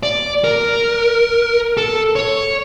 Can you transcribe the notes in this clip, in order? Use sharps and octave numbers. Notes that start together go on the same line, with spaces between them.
D5
A#4
A4
C#5